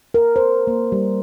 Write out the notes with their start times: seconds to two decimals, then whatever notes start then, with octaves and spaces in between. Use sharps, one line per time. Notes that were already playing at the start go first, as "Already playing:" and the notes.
0.14 A#4
0.36 C5
0.67 A#3
0.92 G3